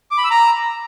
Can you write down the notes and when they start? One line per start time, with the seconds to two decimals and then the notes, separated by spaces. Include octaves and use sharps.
0.11 D6
0.18 B5
0.24 E6
0.31 A#5